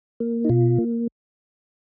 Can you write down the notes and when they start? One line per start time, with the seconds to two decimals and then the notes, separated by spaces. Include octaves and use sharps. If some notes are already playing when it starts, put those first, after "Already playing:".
0.20 A#3
0.45 D#4
0.49 B2 F4
0.78 A#3